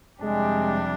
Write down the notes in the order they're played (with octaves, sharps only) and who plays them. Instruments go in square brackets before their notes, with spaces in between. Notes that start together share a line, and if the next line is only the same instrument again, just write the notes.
[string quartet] F2 C3 G3 D4 G4 [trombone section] G#3